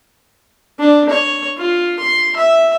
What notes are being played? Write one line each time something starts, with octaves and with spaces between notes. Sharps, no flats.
D4
C#5
F4
C6
E5